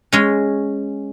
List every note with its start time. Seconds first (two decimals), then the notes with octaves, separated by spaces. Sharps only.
0.13 G#3 C#4